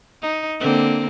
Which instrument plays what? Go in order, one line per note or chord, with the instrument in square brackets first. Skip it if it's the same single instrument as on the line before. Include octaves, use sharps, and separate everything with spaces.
[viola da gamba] D#4
D3 A#3 C4